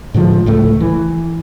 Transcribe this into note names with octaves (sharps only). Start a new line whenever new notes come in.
A2 D3 F3 G#3
C#2 A2 A3
E3